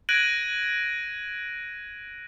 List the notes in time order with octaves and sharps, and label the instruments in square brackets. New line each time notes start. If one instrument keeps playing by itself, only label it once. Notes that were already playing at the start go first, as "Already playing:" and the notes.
[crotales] F#6 G#6 A#6 D7 D#7 F#7